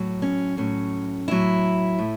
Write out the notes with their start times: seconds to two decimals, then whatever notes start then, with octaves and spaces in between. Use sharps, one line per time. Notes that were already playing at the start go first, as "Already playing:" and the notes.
Already playing: A2 F#3
0.22 C#4
0.57 A2 F#3 C#4
1.28 A2 F#3 E4
1.99 A2